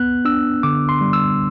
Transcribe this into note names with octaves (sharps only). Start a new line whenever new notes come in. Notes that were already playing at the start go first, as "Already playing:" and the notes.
Already playing: B3 F#6
D4 E6
D3 D6
C6
G3
E6